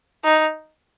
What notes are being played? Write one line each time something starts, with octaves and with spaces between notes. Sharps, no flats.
D#4